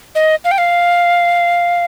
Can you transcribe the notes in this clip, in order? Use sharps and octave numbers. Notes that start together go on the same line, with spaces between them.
D#5
F5
G5
F5